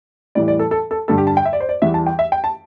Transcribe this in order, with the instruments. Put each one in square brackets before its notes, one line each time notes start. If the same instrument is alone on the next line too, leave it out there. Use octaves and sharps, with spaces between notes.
[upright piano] A2 E3 G3 D5
D5
A4
A4
A4
G2 D3 G3 A4
G4
A5
G5
E5
D5
C5
D5
E2 E3 G3 E5
A5
G5
E5
G5
A5